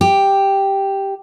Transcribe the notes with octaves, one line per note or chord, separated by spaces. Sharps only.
G4